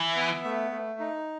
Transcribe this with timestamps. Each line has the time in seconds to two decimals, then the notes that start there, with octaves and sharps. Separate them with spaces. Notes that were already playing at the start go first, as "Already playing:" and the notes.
Already playing: E3 E5
0.16 B3
0.44 A3
0.71 A3
0.99 D#4